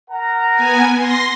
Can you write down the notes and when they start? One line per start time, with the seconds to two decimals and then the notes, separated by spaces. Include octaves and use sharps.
0.11 A#4 F#5 A#5
0.54 B3 G#5
0.96 C6 A#6